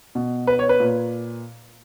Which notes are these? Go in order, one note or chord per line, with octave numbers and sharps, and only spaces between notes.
B2
B4
C#5
B4
A#2